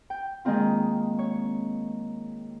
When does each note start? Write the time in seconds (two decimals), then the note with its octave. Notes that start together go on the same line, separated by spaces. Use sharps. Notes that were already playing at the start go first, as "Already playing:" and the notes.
0.10 G5
0.45 D#3 G#3 A#3 C4 F4
1.19 C#5